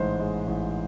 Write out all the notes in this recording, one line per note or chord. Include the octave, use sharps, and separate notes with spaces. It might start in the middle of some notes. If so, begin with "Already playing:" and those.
Already playing: A1 G#2 G#3 C5
G#3
A1